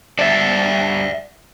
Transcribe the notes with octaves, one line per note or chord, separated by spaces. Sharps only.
G2 A4 D5 E5